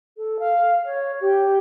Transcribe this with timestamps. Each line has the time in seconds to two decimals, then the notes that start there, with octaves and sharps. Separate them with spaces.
0.18 A4
0.39 F5
0.85 C#5
1.21 G4